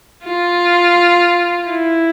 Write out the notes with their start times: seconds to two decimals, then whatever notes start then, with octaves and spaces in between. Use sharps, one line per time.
0.24 F4
1.67 E4